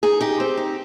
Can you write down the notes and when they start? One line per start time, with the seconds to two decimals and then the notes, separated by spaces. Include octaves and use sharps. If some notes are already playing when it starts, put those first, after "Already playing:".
0.03 D#4 G#4
0.21 D#4 G4
0.40 C4
0.57 D#4